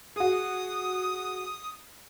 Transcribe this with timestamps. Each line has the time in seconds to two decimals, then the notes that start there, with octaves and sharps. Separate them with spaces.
0.16 F#4 G#4 D#6